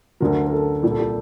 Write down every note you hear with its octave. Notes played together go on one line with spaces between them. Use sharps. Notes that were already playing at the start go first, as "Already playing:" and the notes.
D2 D3 F#3 A#4
A#4
A4
C2 A#2 G3 G4
A4
G4